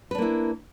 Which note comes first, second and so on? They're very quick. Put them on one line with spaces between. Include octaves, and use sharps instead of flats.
B4 D4 A#3 E4